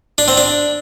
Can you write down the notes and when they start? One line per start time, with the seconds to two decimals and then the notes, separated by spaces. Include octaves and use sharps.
0.18 D4
0.28 C4
0.37 D4